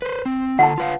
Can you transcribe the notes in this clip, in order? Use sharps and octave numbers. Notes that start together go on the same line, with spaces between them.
B4 C5
C4
D3 F4 A4 F#5 A5
F4 B4 F5